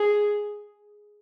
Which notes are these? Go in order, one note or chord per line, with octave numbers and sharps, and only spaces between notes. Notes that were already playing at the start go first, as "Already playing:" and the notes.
Already playing: G#4